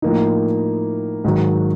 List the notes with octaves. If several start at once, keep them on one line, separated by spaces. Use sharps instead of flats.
A2 F3 A#3 D#4
G#2 D#3 F#3